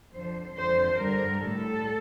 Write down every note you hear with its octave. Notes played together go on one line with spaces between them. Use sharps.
F2 D3 F3 C5
F2 D3 F3 C5
G2 D3 G3 A#4
A2 G3 A4